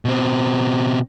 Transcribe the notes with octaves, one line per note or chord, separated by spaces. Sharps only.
B2 C4